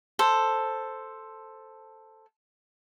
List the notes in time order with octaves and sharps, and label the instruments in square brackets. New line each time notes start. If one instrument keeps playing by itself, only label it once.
[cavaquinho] A4 C5